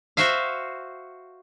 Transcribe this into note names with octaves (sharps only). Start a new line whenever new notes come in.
F#4 C5 E5 F5